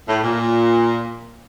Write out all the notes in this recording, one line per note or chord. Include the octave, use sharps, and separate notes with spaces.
A2
A#2